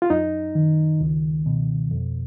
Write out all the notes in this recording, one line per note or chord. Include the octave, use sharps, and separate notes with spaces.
F4
F#2 D#4
D#3
C#2
B2
F2